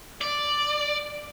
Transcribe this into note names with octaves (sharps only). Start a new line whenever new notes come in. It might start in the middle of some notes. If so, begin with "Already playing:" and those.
D5